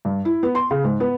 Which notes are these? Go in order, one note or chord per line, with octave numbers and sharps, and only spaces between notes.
G2
E4
B3
C6
C#3
G#2
B3